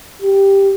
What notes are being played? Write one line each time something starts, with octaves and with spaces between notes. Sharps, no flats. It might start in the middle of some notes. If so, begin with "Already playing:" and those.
G4